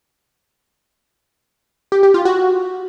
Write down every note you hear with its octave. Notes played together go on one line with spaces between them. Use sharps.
G4
G4
F4
F#4